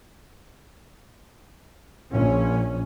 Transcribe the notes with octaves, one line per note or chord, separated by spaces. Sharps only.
A#1 C#4